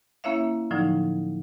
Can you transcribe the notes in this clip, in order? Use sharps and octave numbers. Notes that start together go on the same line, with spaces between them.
A#3 C#4 E4 C#5 E5 F5
A2 D3 F3 F#3 D#4